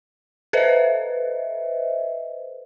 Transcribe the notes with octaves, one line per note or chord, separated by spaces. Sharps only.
A4 B4 C5 D#5 E5